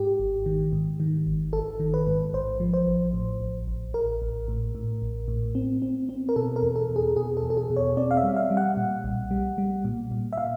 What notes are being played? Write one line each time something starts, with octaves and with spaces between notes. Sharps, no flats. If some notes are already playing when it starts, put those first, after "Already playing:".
Already playing: G#2 G4
G#1
D#3
G#2
D#3
G#1
G#1 A4
D#3
B4
G#2
A1 C5
F3
C5
A1
A2
A1
A1
A1 A#4
A1
A2
A2
A1
A2
C4
C4
C4
A#4
B2 A4
A#4
E2
A4
B2
G#4
B2 G#4
A4
E2
A4
G#4
B2
C#5
C4 D5
F5
E5
G3
F5
G3
F#5
A#2
B1
G3
G3
A#2
A#2
E5
A#2 F5